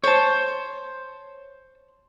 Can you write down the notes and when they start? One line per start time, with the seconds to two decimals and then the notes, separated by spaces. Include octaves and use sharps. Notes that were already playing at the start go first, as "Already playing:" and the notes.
0.04 C5 C#5 A5